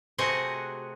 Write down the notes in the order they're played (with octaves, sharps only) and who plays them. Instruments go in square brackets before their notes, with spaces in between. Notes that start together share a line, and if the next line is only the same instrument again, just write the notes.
[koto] C3 A3 C4 F#4 G#4 D#5